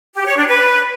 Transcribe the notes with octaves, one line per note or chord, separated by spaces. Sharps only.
G4
C#5
D4
B4